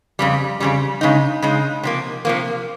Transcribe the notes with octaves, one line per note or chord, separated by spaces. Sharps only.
F2 C#3 G3
F2 C#3 G3
C#3 G#3 D#4
C#3 G#3 D#4
C3 F3 A#3
C3 F3 A#3